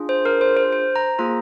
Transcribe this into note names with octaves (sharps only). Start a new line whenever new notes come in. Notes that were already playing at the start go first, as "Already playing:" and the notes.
Already playing: D4 F4 G#4
C5
A#4
C5
C5
C5
A#5
A#3 F4 G#4 A#5